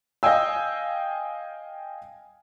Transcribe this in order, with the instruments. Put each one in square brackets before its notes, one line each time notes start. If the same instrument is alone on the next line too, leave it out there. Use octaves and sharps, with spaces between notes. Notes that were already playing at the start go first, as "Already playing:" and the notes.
[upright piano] D#5 F5 G5 G#5 E6